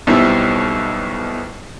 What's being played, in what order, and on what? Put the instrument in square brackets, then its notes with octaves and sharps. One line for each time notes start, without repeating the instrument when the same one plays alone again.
[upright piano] B1 B2 G3 C4 E4